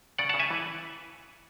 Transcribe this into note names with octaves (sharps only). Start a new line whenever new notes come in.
C#3 D5 F#5
F#5 A5
C#3
E5 G#5
E3